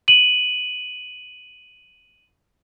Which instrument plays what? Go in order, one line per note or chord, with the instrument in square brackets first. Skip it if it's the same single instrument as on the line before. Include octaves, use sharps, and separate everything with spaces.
[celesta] D#7 F#7